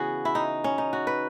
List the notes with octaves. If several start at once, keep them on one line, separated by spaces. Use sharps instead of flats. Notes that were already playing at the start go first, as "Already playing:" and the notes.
Already playing: C#3 E3 B3 F#4 G#4
E4
D#4
C#4
D#4
F#4
B4